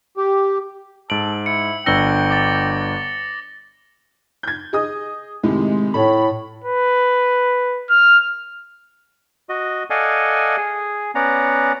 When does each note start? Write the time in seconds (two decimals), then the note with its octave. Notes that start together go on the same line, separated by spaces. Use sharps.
0.17 G4
1.10 G#2 A4 D7 F#7
1.46 E4 C#7
1.86 G1 D4 G5 E6 A#6 C#7 G7
2.30 D6 A6
4.43 G6 G#6
4.73 G#4 D#5 D#6
5.43 A2 C3 D#3 G#3
5.94 A2 A4 C#5 B5
6.64 B4
7.90 F6
9.49 F#4 D#5
9.90 A4 D5 D#5 F5 F#5 G#5
10.57 G#4
11.15 B3 C#4 D5 F#5 A#5